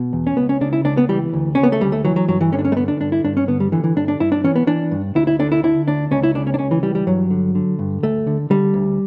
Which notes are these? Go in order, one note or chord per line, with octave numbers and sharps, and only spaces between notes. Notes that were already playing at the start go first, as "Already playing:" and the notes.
Already playing: B2
E2
C#4
C#2 B3
C#4
C#3 D4
E4
C#2 D4
B3
E3 G3
D2
C#3 C#4
B3
A3
D2 G3
A3
E3 F#3
F#3
G2 F#3
E3
D3 C#4
D4
C#4
A3
D3 B3
D4
G2 D4
E4
G2 D4
C#4
D3 B3
G3
D3 E3
E3
G2 D4
D4
G2 E4
D4
E3 C#4
B3
E3 D4
G2
D2 E4
E4
D3 D4
E4
D3 E4
D2 D4
C#2 C#4
E4
C#3 D4
C#4
D4
C#2 C#4
E3
E3 G3
G3
G2 F#3
D3
D3
G2
D2 A3
D3
D3 G3
D2